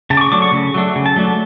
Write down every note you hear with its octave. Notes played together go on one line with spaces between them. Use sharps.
C#3 A5
D6
C#6
F#3 A3 D4 D6
C#6
C#3
F#3 A3 D4
C#3
A5
F#3 A3 D4